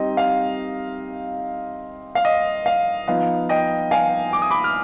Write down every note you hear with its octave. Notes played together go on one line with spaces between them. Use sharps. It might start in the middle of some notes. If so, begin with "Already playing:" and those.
Already playing: G3 C4 D#4 D#5
F5
F5
D#5
F5
F3 B3 D#4 F5
D#5 G5
F5 G#5
D6
D#6
B5 D6
F6